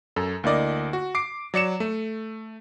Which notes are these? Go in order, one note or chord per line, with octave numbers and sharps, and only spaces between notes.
F#2 A4
D2 A#3 E4 D5 D#5
F#4
D6 C7 D7
F#3 D5 C#7 E7
A3